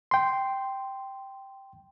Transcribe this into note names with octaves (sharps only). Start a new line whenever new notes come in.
G5 C6